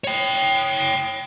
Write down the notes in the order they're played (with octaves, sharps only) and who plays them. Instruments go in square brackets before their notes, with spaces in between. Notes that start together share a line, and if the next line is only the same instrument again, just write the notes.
[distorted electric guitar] C#5 G5